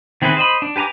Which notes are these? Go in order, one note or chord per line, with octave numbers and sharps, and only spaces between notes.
D#3 C4 E4 G#4 B4
C5 D#5 B5
D4
G4 B4 G#5 A#5 D6